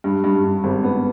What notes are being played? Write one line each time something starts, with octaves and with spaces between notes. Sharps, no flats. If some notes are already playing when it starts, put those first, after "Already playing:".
G2
G2
G2
G#1
B3